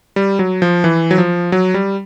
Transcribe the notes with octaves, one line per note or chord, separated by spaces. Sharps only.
G3
F#3
F3
E3
F#3
F3
F#3
G3